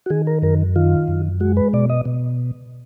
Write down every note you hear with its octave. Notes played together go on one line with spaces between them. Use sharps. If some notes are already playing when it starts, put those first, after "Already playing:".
F#4
D#3 G#4
A#4
F#2 A#4
D#3 F4
F#2
G#3 F#4
B4
B2 D5
D#5
B2